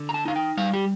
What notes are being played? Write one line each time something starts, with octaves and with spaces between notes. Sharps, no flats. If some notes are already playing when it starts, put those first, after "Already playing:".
Already playing: D3
A#5
A5
D#4 F5
G5
G3 F5
G4